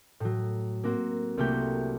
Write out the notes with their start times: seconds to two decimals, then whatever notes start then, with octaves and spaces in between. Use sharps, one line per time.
0.20 A2 F#3
0.84 A#3 C4 F#4
1.37 C2 A3 A#3 F#4 G4 G6